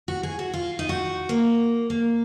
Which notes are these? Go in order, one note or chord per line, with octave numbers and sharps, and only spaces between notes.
F#4
G#4
F#4
F4
D#4
F#4
A#3
A#3